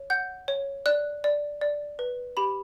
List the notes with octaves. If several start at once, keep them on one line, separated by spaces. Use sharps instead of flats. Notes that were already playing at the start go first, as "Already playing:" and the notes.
Already playing: C#5
F#5 G6
C#5
D5 F#6
D5
D5
B4
G4 B5